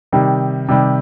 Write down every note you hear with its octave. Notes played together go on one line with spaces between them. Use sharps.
C3 D#3 G3
C3 D#3 G3